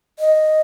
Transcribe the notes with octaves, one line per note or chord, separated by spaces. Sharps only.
D#5